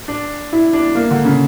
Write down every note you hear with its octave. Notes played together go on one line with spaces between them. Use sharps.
D4
E4
D4
A#3
D3
C#3